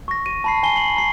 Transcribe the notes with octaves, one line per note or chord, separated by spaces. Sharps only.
C#6 A#6
D#7
A5 B5 C7
G#5 C7 G7
C7 F#7
A#5 C7